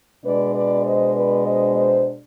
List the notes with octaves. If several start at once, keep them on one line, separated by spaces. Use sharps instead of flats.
B2 G#3 D4 B4 D5
B4 D5
C5 D#5
B4 D5
C5 D#5
C5 D#5